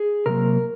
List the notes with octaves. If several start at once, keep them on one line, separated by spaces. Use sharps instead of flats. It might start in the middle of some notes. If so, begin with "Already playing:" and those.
Already playing: G#4
C3 F#3 A#3 A#4